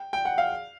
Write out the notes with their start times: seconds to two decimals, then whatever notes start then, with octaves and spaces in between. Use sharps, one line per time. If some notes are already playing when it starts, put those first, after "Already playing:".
Already playing: G5
0.13 G5
0.25 F#5
0.38 F5